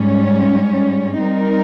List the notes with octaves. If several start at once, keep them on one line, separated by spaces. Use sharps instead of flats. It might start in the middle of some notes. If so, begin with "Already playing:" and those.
Already playing: G#2 G3 C#4
G3 C4 D#4 A#4